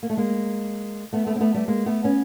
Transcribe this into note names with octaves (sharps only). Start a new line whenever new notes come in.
A#3
A3
G#3 A#3
A3 B3
A3 B3
C4
A3 B3
G3 A3
G#3 A#3
A3 B3
B3 C#4